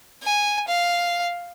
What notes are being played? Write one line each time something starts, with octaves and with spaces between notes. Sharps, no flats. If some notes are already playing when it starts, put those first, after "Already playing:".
G#5
F5